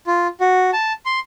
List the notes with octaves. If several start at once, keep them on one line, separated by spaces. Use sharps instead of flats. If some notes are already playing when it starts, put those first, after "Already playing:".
F4
F#4
A5
C6